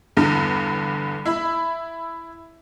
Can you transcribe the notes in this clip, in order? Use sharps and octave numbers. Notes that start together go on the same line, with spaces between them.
E2 G2 D3
E4 E5 B5